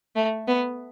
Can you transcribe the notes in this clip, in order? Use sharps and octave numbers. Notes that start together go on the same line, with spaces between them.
A3
B3